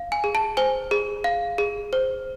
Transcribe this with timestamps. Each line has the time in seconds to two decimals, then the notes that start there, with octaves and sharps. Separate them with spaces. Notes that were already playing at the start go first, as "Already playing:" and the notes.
Already playing: F5
0.12 G#5
0.24 G#4
0.35 A5
0.57 C5 G#5
0.91 G#4
1.24 F5
1.58 G#4
1.93 C5